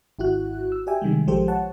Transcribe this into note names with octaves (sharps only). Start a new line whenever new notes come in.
G#1 E4 F#4 F#6
E6
G4 D5 E5 G5 G#5
C3 D#3 G3 G#3
A#1 F3 G#3 G4 A4 C5
C#5 F#5 A5